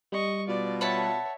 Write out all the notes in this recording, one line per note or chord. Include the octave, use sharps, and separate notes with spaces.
G3 D#5 C#6
B2 F4 D5
C#5 E5 F#5 A5 B5